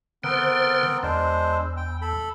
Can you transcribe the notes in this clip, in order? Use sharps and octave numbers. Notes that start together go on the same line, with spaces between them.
D3 B3 C4 A#4 C5
E2 G#3 D4 C5
G5
A4 B5